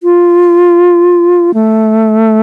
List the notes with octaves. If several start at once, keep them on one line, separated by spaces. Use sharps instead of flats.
F4
A3